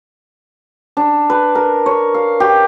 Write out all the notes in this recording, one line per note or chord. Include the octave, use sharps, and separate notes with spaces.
D4
B4
A#4
C#5
F5
G4